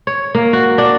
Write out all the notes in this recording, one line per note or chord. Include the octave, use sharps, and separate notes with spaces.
C#5
A#3
F#4
D4